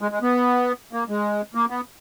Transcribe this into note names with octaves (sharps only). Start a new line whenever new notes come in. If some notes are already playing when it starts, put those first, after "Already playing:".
G#3
G#3
B3
A#3
G#3
A#3
B3